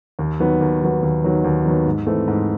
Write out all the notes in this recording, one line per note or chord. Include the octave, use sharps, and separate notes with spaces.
D#2
D#3 F#3 B3
D#2
D#3 F#3 B3
D#2
D#3 F#3 B3
D#2
D#3 F#3 B3
G#2
E3 A3 C4
G#2